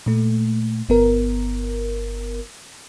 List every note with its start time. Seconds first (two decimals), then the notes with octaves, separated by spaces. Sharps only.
0.06 A#2 A3
0.89 G1 B3 A#4